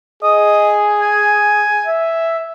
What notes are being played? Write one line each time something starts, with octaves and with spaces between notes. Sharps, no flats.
G#4 D#5
G#5
E5